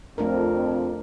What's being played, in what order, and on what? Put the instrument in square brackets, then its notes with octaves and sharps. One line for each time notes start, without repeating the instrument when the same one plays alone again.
[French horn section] F2 [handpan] A3 D4 A#4